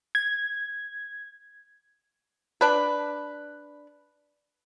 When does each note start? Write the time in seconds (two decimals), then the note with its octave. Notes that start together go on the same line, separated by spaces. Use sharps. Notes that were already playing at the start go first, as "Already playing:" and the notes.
0.15 G#6
2.61 D4 B4